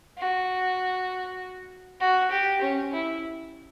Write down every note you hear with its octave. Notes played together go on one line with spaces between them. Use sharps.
F#4
F#4
G4
C#4
E4